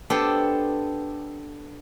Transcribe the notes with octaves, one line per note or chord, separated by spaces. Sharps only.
B3 D4 G4 A4 C5